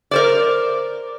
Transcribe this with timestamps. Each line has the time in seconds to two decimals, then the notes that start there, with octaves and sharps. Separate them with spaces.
0.11 A#4 C5 D5